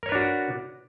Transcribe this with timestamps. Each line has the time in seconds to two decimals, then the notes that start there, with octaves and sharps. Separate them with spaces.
0.03 A#4
0.06 C#5
0.09 B4
0.12 D4
0.15 F#4